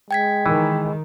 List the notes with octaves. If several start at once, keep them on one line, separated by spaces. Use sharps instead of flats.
G#3 G5 G#6 B6
D#3 E3